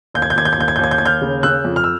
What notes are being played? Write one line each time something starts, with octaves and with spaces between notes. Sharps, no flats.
D#2 G6
G#6
G6
D#2 G#6
G6
G#6
D#2 G6
G#6
G6
D#2 G#6
G6
D#2 G#6
F6 G6
C#3
C#3 E6 F#6
F2
F6
E6